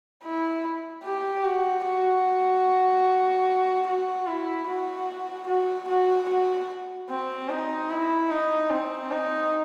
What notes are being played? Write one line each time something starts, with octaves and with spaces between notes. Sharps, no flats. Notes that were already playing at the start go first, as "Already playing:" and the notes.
E4
G4
F#4
F#4
F#4
E4
F#4
F#4
F#4
F#4
C4
D#4
E4
D#4
C4
D#4